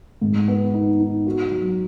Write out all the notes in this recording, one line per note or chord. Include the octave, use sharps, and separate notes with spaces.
G#2
B3
D#4
D#4
F#4
F#3